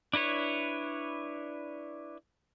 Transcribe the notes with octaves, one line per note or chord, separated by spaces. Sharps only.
D4 E4 B4 C#5